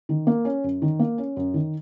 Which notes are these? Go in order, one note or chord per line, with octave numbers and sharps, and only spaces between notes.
D#3
A#3
C#4
F#2
D#3
A#3
C#4
F#2
D#3